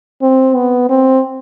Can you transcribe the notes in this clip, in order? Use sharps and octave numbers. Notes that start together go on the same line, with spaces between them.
C4
B3
C4